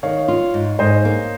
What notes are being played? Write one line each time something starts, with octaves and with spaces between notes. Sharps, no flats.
D#3 C#5 F5
F4
G#2
G#2 C5 D#5
A#3